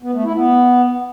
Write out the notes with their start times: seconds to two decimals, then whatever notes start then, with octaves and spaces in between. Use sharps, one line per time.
0.02 B3
0.13 A3
0.24 E4
0.35 B3